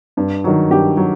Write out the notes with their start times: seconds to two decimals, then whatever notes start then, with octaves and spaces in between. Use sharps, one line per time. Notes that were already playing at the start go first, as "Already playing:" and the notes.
0.17 G2
0.44 D#3 F#3
0.70 G2 G4
0.97 F#3